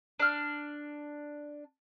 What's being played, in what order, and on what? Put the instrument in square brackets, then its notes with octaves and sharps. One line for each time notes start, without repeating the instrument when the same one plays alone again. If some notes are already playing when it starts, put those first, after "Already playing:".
[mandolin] D4 F6